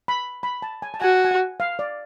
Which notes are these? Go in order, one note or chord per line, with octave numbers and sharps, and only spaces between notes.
B5
B5
A5
G#5
A5
F#4 G#5
G#5
F#5
F5
D5